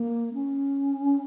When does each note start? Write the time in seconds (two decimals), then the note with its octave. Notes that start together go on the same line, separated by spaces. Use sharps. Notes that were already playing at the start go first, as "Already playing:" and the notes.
Already playing: A#3
0.34 C#4